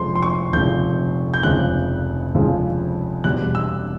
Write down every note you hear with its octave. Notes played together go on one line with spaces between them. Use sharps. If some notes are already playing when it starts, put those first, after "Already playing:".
Already playing: F1 F2 C#3 F3 G#3 C6
C6
C#6
F1 F2 C#3 F3 G#3 G6
G6
F1 F2 C#3 F3 G#3 F#6
F1 F2 C#3 F3 G#3
E1 E2 B2 G3 F#6
E6